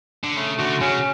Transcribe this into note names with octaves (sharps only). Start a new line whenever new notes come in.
D3
C#3 A3
D3 F#4
C#3 C#4